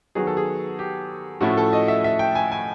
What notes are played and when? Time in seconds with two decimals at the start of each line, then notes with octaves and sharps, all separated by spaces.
0.15 D#3 F#3 B3 G#4
0.27 A4
0.37 G#4
0.79 G4
1.41 A2 F3 A3 C#4 E4 F#4
1.57 A4
1.73 D#5
1.88 E5
2.04 E5
2.19 G5
2.35 G#5
2.52 G#5